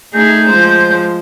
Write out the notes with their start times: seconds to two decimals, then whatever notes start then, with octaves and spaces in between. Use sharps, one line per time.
0.14 A3 D#4 G#4 G6
0.49 F3 G#3 C5